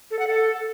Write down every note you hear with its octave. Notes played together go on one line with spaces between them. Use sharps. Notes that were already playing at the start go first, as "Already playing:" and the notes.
A4
F#5
A4